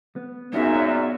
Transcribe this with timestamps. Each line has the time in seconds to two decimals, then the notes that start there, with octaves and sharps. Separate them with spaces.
0.16 B3
0.54 F#2 A#2 B3 D#4 F#4 G#4 E5